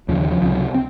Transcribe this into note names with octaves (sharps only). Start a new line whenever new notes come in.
D#2 C#3 F3
D#3
F3
C#2 C3 F3
F#3
C4